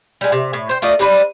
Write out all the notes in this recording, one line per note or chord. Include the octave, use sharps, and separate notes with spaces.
G3 G#3
C3
A2
C5 G5
A3 F4 D5 D#5
G3 C4 D4 B4